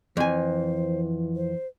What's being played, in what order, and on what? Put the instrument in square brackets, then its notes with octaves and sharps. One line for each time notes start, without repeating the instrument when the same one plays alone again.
[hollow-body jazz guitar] F2 G#5 [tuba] E3 [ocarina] C5
[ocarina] C5